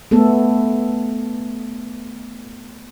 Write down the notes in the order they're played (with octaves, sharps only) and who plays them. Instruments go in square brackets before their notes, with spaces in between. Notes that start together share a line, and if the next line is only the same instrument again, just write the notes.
[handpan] A3 B3 A4